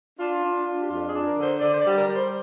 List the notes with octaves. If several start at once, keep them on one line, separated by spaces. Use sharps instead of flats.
D4 F4
D4
D4
G4
F2 F4
G#4
D4
A#4
D3
C5
D3 D5
C5
D5
G3
A#4
G3
C5